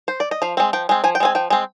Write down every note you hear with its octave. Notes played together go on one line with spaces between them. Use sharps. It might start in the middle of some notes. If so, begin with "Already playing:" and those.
C5
D5
D#5
F3 F5
G#3 C4
F3 G5
G#3 C4
F3 G#5
G5
G#3 C4 G#5
F3 G5
G#3 C4